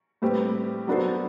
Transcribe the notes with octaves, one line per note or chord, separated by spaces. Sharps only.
A2 G3 C4 G4 B4
F#3 B3 D4 A4 C5